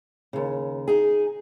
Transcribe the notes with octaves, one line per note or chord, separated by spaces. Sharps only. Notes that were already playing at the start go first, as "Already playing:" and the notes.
D#2 C#3
D#4 G#4